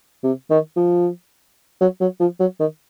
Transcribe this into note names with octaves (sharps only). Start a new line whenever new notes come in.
C3
D#3
F3
F#3
F#3
F3
F#3
D#3